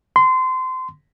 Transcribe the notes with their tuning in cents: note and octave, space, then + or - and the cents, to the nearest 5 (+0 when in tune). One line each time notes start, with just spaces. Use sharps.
C6 -25